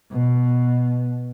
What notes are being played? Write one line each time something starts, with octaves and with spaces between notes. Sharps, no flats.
B2